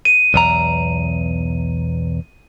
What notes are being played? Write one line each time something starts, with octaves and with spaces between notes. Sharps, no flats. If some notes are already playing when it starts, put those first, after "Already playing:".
D#7
B1 E2 A#5